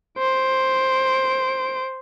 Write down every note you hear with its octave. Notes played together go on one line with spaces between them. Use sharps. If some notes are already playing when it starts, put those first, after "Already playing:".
C5 D7